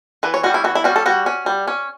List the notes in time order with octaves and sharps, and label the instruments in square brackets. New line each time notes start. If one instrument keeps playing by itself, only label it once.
[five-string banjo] E3 B4
C#5
G3 C#4 F#4
E4
E3 F#4
E4
G3 C#4 F#4
A4
G3 F#4
C#4
G3
C#4